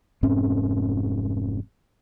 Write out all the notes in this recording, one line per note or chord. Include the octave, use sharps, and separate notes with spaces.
F1 G#2 C4 C#4